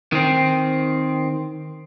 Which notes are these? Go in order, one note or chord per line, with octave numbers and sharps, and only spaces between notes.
D#3 C4